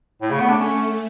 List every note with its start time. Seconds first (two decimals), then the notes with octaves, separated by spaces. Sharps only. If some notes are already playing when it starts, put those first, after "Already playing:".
0.21 A2 A3
0.31 C#3
0.40 B3
0.50 D4
0.59 C#4